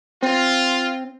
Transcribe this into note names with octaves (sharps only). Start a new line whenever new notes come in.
C4 F4